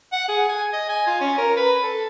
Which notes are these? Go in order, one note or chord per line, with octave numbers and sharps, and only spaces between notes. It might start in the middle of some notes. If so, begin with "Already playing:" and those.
F#5
G#4
G#5
D#5
G#5
F4
C#4
A#4
B4
A4